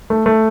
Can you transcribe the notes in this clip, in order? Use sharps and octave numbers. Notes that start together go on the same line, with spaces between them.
A3
A3